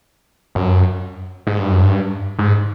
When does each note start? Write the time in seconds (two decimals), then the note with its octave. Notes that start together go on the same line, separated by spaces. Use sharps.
0.55 F#2
1.47 G#2
1.59 G2
1.71 F#2
1.83 G2
2.39 G#2